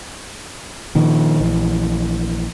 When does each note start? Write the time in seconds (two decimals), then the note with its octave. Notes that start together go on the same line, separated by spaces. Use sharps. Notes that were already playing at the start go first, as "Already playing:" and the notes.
0.95 A#2 D#3 F3
1.41 A#1 E3